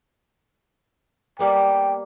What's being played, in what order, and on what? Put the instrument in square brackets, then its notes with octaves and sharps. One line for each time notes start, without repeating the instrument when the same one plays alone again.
[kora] G3 A#3 B3 [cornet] G5